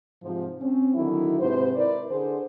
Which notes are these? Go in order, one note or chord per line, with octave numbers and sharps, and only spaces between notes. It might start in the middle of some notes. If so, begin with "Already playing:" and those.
G#2 C3 F3
C4 C#4
D3 D#3 F#3 E4
G#2 C3 B4 C5
E4 A#4 B4 D5
D3 G#4 C5